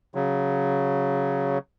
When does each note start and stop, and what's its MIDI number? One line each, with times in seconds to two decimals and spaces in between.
0.15 1.58 49
0.15 1.58 54